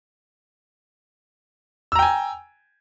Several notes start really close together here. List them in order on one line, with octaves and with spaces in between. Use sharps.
E6 A#5 G5 G#5